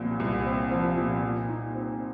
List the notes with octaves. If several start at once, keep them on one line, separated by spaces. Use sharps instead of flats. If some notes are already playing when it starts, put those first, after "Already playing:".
Already playing: C2 A#2 F3 C4
C2
C4
F3
A#2
A#2
D#4
C4